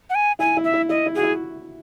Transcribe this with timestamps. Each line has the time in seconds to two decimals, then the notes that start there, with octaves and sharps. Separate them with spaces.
0.10 F#5
0.15 G#5
0.39 E4 G#5
0.57 E4
0.64 E5
0.73 E4
0.89 E4 D#5
1.06 E4
1.15 F#4 G#4
1.23 E4